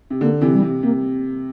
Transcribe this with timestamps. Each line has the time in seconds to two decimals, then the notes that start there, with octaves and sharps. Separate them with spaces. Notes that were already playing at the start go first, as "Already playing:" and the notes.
0.10 C3
0.21 D3 A#3
0.41 C3 E3
0.52 G3
0.62 C3
0.83 C3 A#3